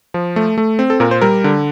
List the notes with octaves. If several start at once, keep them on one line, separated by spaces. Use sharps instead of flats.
F3
A3
A3
C4
A4
A#2 A#4
C5
G3 A#4
D3